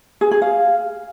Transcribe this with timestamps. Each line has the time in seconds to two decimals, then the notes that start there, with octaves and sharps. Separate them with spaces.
0.21 G#4
0.31 G#4
0.42 F5